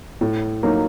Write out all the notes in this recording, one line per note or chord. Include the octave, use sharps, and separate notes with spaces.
A2
F#3 A#3 D#4